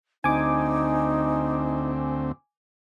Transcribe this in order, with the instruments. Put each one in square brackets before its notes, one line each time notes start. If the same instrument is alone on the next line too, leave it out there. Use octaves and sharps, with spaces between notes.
[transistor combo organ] D2 C4 [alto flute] D#4 [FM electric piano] G#5 D6